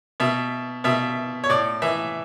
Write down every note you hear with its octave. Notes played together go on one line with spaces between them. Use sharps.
B2 E5
B2 E5
C#5
A2 D5
E3 E5